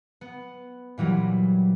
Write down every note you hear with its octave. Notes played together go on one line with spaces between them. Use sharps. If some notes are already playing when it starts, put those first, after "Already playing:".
B3
A#2 E3 F#3 G3